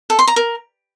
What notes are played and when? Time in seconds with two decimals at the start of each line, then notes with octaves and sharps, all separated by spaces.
0.10 A4
0.19 C6
0.27 A#5
0.36 A#4